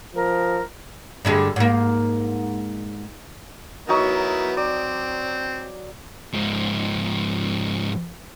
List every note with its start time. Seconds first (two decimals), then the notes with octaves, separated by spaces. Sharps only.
0.15 F3 A#4
1.25 G2 D3 G#3
1.56 G#2 A#3
3.89 F#3 B3 D#4 E4 A#4 C#6
4.57 C4 D5
6.33 G#2 F3